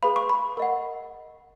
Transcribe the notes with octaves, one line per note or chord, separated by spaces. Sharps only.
G#4 B4 F5 B5
C#6
B5
A#4 D#5 F#5